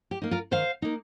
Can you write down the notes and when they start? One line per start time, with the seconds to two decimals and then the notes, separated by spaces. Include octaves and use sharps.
0.11 G4
0.22 A#3 D#4
0.31 F4 A#4
0.51 D#3 C5 F5
0.82 A#3 D#4